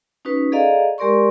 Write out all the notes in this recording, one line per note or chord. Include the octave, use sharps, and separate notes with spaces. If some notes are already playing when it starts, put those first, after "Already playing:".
C#4 D#4 F#4 B4
G#4 A4 D5 D#5 F5 A#5
G#3 G4 A#4 D5 C6 C#6